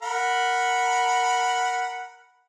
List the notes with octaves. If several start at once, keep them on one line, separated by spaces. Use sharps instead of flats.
A#4 F#5 B5